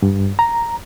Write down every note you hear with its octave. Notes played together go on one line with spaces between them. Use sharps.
G2
A#5